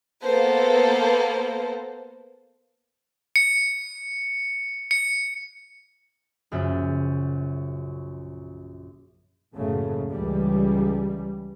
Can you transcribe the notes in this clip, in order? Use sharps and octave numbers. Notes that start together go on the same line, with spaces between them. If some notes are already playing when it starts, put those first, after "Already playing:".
A#3 B3 A4 C5
C#7
C#7
A#1 F#2 C#3 E5 F#5 G6
F#1 B1 F#2 A2 C#3 A3
C#2 E3 G3